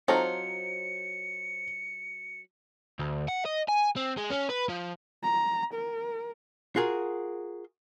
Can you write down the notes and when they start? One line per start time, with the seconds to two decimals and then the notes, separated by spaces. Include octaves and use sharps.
0.08 F#3 C4 D#4 F4 A4 C5 C#5 C#7
2.99 D2
3.28 F#5
3.45 D#5
3.68 G#5
3.96 C4
4.17 G#3
4.30 C#4
4.49 B4
4.69 F3
5.23 A#5
5.74 A#4
6.76 F4 F#4 G#4 A#4